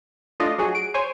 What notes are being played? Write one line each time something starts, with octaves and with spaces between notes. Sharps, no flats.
A3 D4 F4 D#5
F#3 F#4 G#4
D7
C5 C#5 G#5